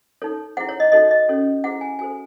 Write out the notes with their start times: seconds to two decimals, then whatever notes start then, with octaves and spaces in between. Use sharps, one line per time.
0.22 D#4 A4 C#5
0.57 E4 G#4 C5 F#5
0.69 C#5
0.80 D#5
0.92 D#4 F#4 A4 C#5 D#5
1.11 D#5
1.28 C#4 F#4 A4 C#5
1.64 E4 G#4 C5 F#5
1.81 G#5
1.99 F#4 A4 C5 G#5